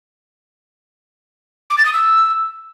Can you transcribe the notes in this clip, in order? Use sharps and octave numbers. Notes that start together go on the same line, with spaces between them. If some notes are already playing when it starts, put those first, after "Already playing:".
D6
A6
D#6
E6